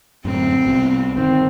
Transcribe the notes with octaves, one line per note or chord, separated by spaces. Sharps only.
F#2 A2 D3 C4
C2 B2
G1 D#3 C4